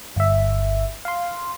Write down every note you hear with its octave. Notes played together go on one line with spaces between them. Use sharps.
G1 E5
F5 C6